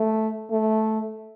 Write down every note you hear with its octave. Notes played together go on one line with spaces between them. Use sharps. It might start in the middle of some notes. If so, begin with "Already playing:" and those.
Already playing: A3
A3